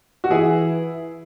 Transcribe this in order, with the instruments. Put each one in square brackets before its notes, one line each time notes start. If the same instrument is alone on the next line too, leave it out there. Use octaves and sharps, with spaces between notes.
[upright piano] F#4
[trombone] E3 [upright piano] E4 G#4